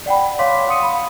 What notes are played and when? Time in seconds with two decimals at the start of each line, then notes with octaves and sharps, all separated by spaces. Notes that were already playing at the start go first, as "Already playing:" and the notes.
0.06 D5 F#5 G5 B5
0.39 C#5 F5 C6 D6 B6
0.68 F5 F#5 C6 D#6 C#7 D#7
0.82 B5